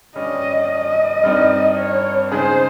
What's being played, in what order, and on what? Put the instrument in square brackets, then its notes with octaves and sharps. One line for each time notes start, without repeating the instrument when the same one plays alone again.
[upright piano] G2 G3 C#4 [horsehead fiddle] D#5
[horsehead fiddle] D#5
[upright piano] G2 G3 C4 D#4
[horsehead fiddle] C#5
[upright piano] C#3 G#3 D#4 G#4 [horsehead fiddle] C5